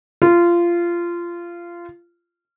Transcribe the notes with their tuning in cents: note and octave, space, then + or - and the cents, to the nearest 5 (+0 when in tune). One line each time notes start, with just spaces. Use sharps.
F4 -20